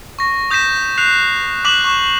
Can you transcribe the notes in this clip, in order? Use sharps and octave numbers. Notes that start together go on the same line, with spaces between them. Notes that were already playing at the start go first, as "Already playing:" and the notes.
C#6 A#6
D#6 G6 A#6 B6 E7
F#6 C7 F7
D6 F#6 B6 E7 F#7
C#6